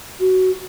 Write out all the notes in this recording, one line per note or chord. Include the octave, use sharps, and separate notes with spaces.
F#4